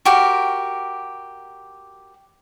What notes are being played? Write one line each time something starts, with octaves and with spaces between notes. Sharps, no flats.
F#4 G4 A#4